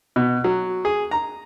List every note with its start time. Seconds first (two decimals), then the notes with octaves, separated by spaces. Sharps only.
0.16 B2
0.44 F#3
0.85 G#4
1.11 A#5